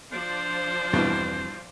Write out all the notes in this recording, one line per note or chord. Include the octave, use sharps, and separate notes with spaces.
F3 D4 C5
E2 G2 B2 E3 B3 C4